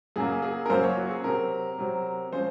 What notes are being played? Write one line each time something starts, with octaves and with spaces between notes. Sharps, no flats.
F#2 C#3 F#3 A#3 G#4
G#4
A#4
F#2 C#3 F#3 A#3 C5
C#5
F#4
G#4
C3 F#3 C4 A#4
C3 F#3 C4
F3 G#3 C#4 C5